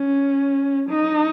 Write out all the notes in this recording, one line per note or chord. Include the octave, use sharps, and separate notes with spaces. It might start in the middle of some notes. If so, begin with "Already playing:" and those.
Already playing: C#4
D#4